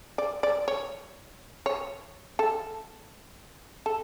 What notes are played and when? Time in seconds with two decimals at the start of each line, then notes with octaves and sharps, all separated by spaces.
0.18 D5
0.43 D5
0.68 C#5
1.66 C#5
2.39 A4
3.86 A4